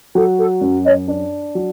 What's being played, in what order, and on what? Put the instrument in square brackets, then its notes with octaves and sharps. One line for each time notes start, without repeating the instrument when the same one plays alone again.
[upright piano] F#3 [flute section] A4
[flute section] A4
[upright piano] F#2
[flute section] C#5 D#5
[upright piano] D4
F#3